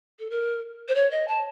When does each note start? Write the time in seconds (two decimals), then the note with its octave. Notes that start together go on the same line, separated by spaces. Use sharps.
0.19 A4
0.30 A#4
0.88 C5
0.95 C#5
1.11 D#5
1.28 A5